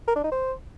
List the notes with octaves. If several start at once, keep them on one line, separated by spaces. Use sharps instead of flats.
A#4
D4
D#4
C5